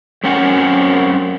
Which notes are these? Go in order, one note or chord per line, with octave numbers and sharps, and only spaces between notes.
F#2 C4 C#4 A#4 F#5 G#5